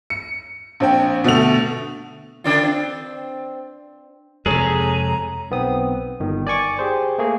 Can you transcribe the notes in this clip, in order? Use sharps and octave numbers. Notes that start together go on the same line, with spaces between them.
C#7
A#1 C4 G5
B2 D3 A3 F7
D3 D4 F4
C4
F2 C3 G#3 G#4 A4 C#5 A#5
B1 B3 C4 D#6
G1 D#3
D5 G#5 C#6 D6
G4 G#4 C5
A3 A#3 G#4